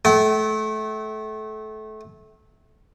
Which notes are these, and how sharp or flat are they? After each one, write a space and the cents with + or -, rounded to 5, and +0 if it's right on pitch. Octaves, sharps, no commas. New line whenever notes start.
A3 -25 G5 -45